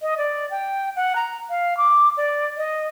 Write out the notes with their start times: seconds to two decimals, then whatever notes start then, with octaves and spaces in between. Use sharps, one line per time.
0.02 D#5
0.18 D5
0.51 G5
0.96 F#5
1.16 A#5
1.50 F5
1.77 D6
2.17 D5
2.57 D#5